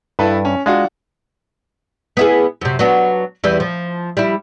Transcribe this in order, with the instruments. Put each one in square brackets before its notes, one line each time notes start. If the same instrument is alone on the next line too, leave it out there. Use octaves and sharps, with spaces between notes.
[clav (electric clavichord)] G2 [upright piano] E4 A4 B4
[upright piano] C#4
[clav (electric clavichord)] G#3 [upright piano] D4 F4 F#4
[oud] B3 E4 G#4
F#2 C3
F#3 B3 D4
E2 E3 G3
F3
G3 E4